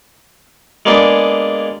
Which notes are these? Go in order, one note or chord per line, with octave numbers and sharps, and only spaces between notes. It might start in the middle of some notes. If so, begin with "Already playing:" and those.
G#3 A#3 B3 D4 G#4